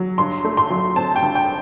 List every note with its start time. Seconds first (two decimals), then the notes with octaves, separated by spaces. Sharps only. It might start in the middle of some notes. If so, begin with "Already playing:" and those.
Already playing: F#3
0.18 G2 C6
0.44 A3
0.57 C6
0.70 F#3
0.96 C4 A5
1.16 G5
1.22 G2
1.35 G5